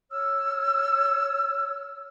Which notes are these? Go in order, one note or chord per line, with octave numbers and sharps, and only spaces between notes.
C#5 E6 F6